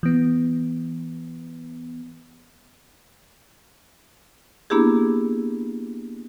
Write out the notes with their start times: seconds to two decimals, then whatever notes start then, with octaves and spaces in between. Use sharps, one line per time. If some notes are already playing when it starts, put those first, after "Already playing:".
0.03 E3 B3
4.70 A#3 B3 D4 E4 G4 G#4